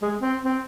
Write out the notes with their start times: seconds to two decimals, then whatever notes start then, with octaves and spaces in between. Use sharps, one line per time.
0.02 G#3
0.22 C4
0.44 C4